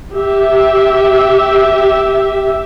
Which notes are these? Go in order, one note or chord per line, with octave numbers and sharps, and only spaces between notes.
G4 E5